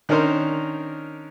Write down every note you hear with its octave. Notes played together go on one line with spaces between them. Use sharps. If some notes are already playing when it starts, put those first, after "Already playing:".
D#3 C#4 D4 A#4 C5